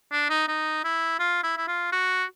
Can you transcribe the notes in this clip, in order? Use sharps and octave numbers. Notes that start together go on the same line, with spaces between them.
D4
D#4
D#4
E4
F4
E4
E4
F4
F#4